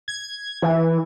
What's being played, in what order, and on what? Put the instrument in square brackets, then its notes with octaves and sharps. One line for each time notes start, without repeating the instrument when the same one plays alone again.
[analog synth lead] G#6
E3